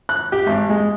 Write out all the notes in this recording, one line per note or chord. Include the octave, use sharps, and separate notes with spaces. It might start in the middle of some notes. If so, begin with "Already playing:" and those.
F#6
G4
G#1
G#3